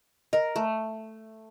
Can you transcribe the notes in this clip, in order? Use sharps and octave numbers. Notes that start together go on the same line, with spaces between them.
A#4 D#5
A3